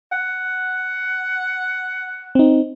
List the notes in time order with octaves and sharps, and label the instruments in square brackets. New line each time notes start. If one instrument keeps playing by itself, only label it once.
[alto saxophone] F#5
[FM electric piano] C4 D#4